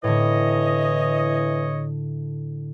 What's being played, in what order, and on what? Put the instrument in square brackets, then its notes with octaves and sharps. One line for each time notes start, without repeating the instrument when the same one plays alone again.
[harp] A2 D3 [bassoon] E3 [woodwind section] C#5 D#5